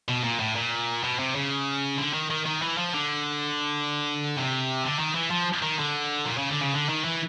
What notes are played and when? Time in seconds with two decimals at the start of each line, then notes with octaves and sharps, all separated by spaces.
0.09 B2
0.24 A#2
0.40 A2
0.56 A#2
1.04 B2
1.19 C3
1.35 C#3
1.98 D3
2.14 D#3
2.31 D#3
2.46 D#3
2.62 E3
2.78 F3
2.94 D3
4.37 C3
4.84 D3
4.99 D#3
5.15 E3
5.31 F3
5.62 D#3
5.79 D3
6.25 A#2
6.38 C#3
6.49 D3
6.61 C#3
6.74 D3
6.89 D#3
7.05 E3